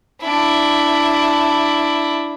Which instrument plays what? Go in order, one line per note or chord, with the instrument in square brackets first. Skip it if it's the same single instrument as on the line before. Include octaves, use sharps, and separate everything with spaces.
[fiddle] D4 E4